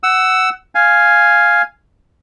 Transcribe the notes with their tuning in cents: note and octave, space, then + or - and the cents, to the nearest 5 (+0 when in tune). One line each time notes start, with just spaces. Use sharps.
F#5 +15 E6 +0
F5 +0 G#5 +0